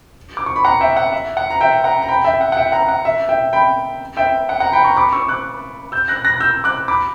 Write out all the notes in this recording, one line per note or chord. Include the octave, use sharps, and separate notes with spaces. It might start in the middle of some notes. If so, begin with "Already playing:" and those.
D6
C#6
B5
F#5 A#5
E5 G5
F#5
E5
F#5
A#5
E5 G5
F#5 A#5
A#5
G5 B5
E5 G5
F#5
F#5
E5 G5
F#5 A#5
F#5
E5
E5 G5
G5 B5
E5 G5
F#5
F#5 A#5
G5 B5
A#5 C#6
B5 D6
C#6 E6
D6 F#6
E6 G6
F#6 A#6
F#6 A#6
E6 G6
D6 F#6
B5 D6